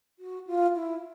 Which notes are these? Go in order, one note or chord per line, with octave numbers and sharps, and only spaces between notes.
F#4
F4
E4